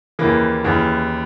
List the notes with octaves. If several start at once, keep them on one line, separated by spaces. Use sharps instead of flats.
D#2 C#3 E3 A#3
D#2 C#3 E3